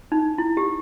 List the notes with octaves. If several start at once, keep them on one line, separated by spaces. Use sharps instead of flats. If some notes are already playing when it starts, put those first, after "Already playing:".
D#4
E4
G4